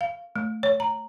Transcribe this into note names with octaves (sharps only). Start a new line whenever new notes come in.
F5
A3
C#5
A#5